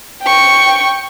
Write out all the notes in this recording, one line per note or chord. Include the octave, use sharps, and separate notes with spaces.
G5 C#6